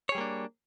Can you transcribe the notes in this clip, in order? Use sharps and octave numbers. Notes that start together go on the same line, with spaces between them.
G3 A#3 D4 G#4 C#5